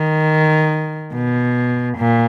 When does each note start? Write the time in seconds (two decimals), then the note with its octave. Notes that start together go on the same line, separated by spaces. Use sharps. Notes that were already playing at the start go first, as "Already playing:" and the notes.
Already playing: D#3
1.13 B2
1.97 A#2